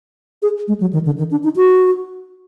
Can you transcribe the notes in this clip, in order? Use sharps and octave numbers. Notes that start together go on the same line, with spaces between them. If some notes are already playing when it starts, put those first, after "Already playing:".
G#4
G#3
F#3
D#3
D3
D#3
D4
D#4
F#4